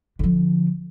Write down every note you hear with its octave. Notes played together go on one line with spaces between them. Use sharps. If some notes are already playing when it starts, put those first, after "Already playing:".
D3 F3